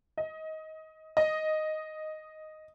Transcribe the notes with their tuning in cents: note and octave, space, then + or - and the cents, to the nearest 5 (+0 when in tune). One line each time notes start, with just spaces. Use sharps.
D#5 +20
D#5 +0